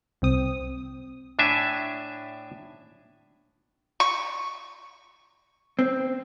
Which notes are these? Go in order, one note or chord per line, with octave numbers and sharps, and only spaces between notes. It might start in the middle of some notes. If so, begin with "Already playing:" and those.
C2 C4 D#6
A2 D4 E5 G#5
C#6
C4